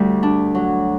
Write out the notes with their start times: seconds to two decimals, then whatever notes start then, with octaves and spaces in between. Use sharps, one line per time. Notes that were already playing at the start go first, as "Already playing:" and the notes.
Already playing: D2 G3
0.23 D4
0.55 F#3